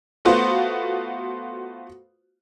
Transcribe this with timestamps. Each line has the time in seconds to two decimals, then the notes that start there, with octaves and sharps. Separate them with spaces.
0.25 A3 B3 F4 F#4 C5